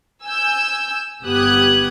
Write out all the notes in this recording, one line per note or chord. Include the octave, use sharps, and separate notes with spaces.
G#5 E6 G6
G1 B3 G4 D#6 F#6 G#6